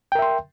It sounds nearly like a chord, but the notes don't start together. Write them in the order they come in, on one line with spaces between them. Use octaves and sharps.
G5 A#4 E5 C6